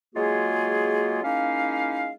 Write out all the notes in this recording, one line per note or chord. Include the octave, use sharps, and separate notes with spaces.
F#3 G#3 A#3 F4 F#4 G#4
G#3 A#3 C#4 D#4 E4 F5